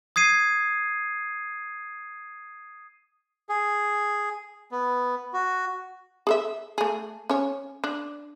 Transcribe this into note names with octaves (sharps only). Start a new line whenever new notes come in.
D#6 G#6 C7 D#7
G#4
B3
F#4
G#4 A4 E5
A3 G#4
C#4 C#5
D4